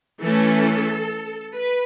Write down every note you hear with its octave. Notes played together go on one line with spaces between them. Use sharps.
E3 A3 C#4 A4
B4